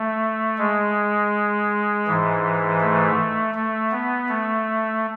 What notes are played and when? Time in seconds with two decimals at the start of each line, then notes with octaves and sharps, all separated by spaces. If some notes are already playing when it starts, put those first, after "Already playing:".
Already playing: A3
0.58 G#3
2.07 G#2 E3
2.80 A3
3.55 A3
3.92 B3
4.29 A3